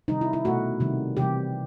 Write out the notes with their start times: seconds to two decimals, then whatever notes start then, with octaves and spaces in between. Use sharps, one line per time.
0.08 C3 D#3 G3 D#4
0.21 E4
0.33 E4
0.45 B2 A3 F#4
0.80 C3 D#3 G3
1.17 C3 E3 G3 G4